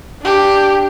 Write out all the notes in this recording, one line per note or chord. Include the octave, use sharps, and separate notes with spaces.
D4 G4